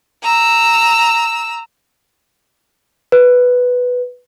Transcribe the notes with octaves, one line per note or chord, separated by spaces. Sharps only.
A#5 E6
B4